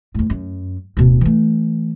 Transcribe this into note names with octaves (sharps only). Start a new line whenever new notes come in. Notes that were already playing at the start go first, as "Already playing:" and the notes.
E2 A2
F#2
D1 B2
E3 A3